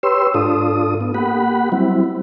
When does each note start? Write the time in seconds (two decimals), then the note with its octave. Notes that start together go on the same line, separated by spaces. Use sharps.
0.03 G4 B4 C#5 C6 E6
0.34 G#2 D4 F4 A4 D#6
1.01 B3
1.14 A#3 G4 F#5 B5
1.72 F#3 G3 C4 E4